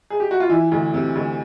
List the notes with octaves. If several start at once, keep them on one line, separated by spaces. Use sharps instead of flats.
G#4
G4
F#4
F4
E3 E4
D2
C3
D2